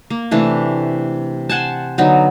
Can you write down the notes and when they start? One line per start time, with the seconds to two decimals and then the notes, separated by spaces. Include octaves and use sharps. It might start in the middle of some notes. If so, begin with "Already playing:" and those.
0.10 A#3
0.31 C3 E3 A3 D4
1.49 C5 F#5 G#5 A5
1.98 D3 F#3 B3 D#4